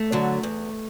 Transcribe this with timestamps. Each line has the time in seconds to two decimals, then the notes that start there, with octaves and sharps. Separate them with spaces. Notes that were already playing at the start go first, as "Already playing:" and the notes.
Already playing: A3
0.12 D3 F#3
0.43 E2